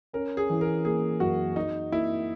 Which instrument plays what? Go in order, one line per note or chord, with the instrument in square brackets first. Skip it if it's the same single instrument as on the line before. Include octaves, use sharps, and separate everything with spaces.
[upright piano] C#4 [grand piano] A#4
[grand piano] G#4
[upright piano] E3
[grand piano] A#4
[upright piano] A#3 [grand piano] G#4
[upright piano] F#2 [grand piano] F#4
[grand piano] D#4 [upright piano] F#4
[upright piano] A#3 [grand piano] E4